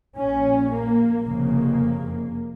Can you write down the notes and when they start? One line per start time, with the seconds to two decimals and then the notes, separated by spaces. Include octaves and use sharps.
0.18 A#1 A#2 C#4
0.71 A#3
1.25 F1 F2 C#3 A#3